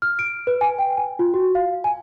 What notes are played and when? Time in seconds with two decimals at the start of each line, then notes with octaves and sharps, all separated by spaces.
0.02 F6
0.19 D7
0.47 B4
0.61 G#5
0.79 G5
0.97 G#5
1.19 F4
1.34 F#4
1.55 F5
1.84 G#5